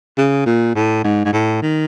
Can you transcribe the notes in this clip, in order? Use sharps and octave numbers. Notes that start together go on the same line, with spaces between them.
C#3
A#2
A2
G#2
G#2
A2
D#3